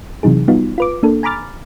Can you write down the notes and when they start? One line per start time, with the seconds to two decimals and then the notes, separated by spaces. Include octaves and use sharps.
0.23 C3 E3 F#3 D#4 G#4
0.48 G3 B3 D#4 F4 F#4
0.78 F4 B4 D6
1.03 A#3 D4 A4
1.23 G#5 A#5 B5 D6 F6 A6